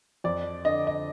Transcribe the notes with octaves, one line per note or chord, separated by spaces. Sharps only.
F2 D5
D3 D#5
D#5